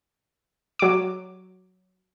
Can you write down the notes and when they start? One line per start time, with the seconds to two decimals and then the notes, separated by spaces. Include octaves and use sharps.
0.79 F#3 D6